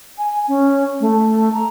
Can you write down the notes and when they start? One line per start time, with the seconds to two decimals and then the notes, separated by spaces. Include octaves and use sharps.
0.18 G#5
0.48 C#4
1.01 A3
1.53 A#5